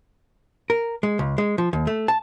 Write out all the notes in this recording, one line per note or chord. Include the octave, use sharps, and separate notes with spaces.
A#4
G#3
C#2
G#3
F3
D#2
A3
A5